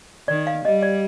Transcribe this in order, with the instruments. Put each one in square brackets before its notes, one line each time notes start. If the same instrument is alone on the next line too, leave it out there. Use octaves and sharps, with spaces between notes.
[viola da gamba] D#3 [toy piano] D5
[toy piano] F5
[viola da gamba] G3 [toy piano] D#5
[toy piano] D5